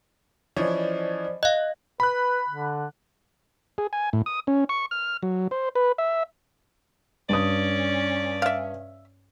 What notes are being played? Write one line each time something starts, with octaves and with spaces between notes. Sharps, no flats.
E3 F3 C#4 C5 D5 D#5
D#5 F5 F#6
B4 B5 F#6
D3
G#4
G#5
A2
D#6
C#4
C#6
F6
F#3
C5
B4
E5
G2 C#4 D5 D#6
E5 F5